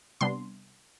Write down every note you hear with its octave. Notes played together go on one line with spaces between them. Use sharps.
C3 G3 B3 D4 C6